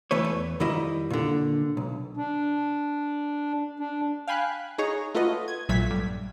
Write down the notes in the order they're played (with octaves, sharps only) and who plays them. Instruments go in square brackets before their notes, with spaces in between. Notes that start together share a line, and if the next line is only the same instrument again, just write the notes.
[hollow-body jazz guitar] E2 E3 A3 B4 C#5
E2
F2 D#3 G3 E4 D#5
A#2 D3
B1
[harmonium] D4
D4
[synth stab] F5 G5 G#5 B5 F#6
D#4 G#4 C#5 A#5
A3 F4 F#4 B4 D#5
G#6
A#1 A#2 F#3 A3 G#6 B6
G2